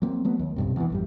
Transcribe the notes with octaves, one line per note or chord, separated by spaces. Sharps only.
F#3 A#3 C4
F#3 A3 B3
D#2
B1 G2 C3
E2 E3
A1 F#2 G3